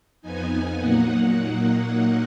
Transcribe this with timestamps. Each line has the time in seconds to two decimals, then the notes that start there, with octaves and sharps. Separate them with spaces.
0.22 F2 F3 B3 D#4 G#5
0.79 A#2 F#3 A#3 D#4 F#5